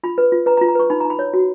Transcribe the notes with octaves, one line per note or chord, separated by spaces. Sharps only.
F4 B5
B4
F4
B4 A#5
A#5
F4
A#5
B4 C#6
D#4 B5
D#4 A#5
B5
C#5
F#4